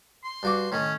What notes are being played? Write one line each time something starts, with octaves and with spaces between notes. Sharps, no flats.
C6
G2 F#4 D6
A2 D#3 C#4